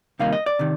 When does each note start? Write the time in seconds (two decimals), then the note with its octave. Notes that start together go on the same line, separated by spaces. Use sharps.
0.19 C3 D#3 G3 A#3 D#4 F5
0.32 D#5
0.46 D5
0.59 C3 D#3